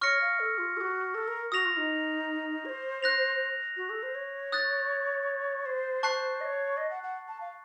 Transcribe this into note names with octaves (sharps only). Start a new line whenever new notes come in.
C#5 C#6 F6 A#6 C#7
F5
A4
F4
A4
F#4
A4
A#4
F#4 D#6 A#6 F7
F4
D#4
C#5
C5
F#6 A#6 F7
F#4
A4
C5
C#5
D#6 F#6 A6
C5
A5 C#6 F#6 C7
D#5
C#5
D#5
F#5
F#5
A5
F5